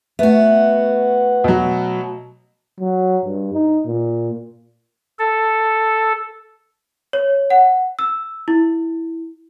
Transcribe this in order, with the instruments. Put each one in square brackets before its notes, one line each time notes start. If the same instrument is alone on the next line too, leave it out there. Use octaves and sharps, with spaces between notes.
[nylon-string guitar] A3 E5 [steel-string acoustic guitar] B3 F#4
[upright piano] B2 F#3
[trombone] F#3
G2
D#4
A#2
[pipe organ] A4
[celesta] C#5
F#5
E6
E4